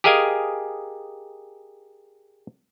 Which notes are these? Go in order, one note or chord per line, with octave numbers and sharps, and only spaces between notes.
G4 G#4 A#4 D#5 F5 G#5